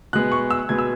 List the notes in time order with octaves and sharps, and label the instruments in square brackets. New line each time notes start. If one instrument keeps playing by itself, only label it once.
[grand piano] B2 G#3 B3 F#6
C#6
E6
B2 G#3 B3 G#6
E6